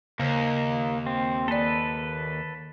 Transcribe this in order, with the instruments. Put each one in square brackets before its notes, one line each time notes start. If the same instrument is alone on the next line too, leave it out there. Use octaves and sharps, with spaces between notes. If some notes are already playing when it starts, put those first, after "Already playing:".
[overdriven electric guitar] D#2 [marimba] C#3 [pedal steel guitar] A#3
[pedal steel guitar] C4
[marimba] A#3 D5 [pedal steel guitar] A4 B4